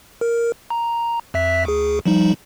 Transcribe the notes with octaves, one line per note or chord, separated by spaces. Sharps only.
A#4
A#5
F2 E5 B6
D2 G#4
F3 G3 D#4